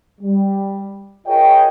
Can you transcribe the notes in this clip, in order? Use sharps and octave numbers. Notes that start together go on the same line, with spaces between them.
G3
F4 G#4 A#4 C#5 D#5 G5